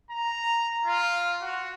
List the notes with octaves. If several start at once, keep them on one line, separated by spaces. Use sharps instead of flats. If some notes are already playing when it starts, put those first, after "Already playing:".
A#5
F4
F#4